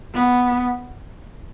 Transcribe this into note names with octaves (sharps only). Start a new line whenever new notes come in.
B3